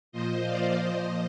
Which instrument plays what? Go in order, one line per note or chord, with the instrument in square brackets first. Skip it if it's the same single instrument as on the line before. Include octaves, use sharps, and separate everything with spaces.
[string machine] A#2 F3 C5 D#5
D5 F5
A#2 F3 C5 D#5